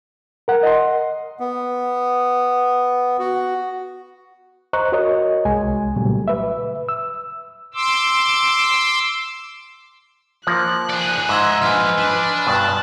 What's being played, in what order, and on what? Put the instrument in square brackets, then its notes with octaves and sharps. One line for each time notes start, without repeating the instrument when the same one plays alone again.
[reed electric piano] A#4 F#5
[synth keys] D#5 C6
[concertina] B3
F#4
[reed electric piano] C5 D#5 A#5 C#6 F#6
F#4 A#4 C#5 D#5 C#6
C2 G#3 G#5
A#2 C#3 F#3 G3 A3 G4
B4 E5
E6
[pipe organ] C6 D6 E6
[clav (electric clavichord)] F3 A#3 [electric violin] F#6
[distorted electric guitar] G#4 D5
[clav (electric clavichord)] G#2 [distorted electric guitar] D#5 E5 [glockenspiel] C6 E6 G#6
[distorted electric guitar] F3 D4 [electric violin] B4 [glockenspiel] G#5 F6
[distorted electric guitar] D4
[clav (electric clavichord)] G2 B2 [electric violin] A5 F#6